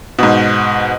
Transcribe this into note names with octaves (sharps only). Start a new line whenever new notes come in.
G#2 B2